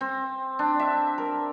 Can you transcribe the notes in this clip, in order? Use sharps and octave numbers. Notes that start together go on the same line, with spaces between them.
C4
D4
E5
A#4